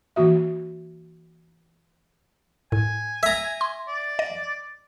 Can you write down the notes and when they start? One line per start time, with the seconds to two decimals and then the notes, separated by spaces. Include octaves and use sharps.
0.16 E3 A#3 F#4 E5
2.72 A2 G#5
3.23 E5 A#5
3.61 C6
3.88 D5
4.19 D#5